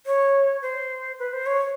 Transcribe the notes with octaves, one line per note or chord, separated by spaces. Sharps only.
C#5
C5
B4
C5
C#5